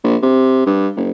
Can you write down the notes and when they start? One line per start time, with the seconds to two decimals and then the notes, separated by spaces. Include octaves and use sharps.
0.04 A#1
0.22 C3
0.66 G2
0.97 F#1